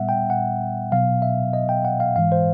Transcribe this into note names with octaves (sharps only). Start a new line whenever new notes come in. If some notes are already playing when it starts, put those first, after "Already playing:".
Already playing: A#2 G3 B3 E5 F#5
G5
F#5
B2 F#3 B3 F5
E5
D#5
G5
F#5
F5
G#2 E3 G#3 F5
C5